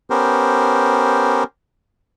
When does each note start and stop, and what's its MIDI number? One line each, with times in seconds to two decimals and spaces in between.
0.10 1.44 59
0.10 1.44 61
0.10 1.44 67
0.10 1.44 70
0.10 1.44 72